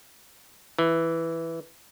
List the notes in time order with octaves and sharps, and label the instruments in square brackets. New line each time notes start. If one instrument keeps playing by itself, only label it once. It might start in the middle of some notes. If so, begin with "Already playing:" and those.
[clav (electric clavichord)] E3